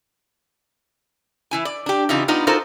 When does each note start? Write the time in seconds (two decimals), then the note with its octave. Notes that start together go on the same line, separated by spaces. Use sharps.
1.51 E3 E4 G#5
1.65 D5
1.86 D4 G4
2.09 C#3 E3 D#4 F4
2.28 B3 D4 D#4 F4
2.47 D#4 F4 F#4 A4 A#4 C5